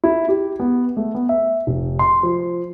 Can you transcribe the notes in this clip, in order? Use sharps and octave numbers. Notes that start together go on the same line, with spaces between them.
E4
G4
B3
A3
B3
E5
F1
C6
F3